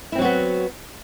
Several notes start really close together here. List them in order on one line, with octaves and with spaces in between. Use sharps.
E4 C4 F#3 F#4 B3